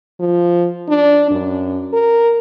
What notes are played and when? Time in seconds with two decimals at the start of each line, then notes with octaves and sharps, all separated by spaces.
0.20 F3
0.89 D4
1.31 F#2
1.93 A#4